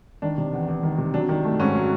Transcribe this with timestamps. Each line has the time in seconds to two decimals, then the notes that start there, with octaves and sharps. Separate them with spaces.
0.22 D#3 D4
0.38 C3
0.53 E2
0.68 E2
0.83 D#3
0.98 C3
1.14 F#3 D4
1.29 D#3
1.44 A3
1.59 G#2 C#4
1.75 F#3